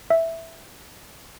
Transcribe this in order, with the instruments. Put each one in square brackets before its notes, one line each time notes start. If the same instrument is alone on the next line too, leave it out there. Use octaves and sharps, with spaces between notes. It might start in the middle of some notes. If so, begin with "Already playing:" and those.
[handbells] E5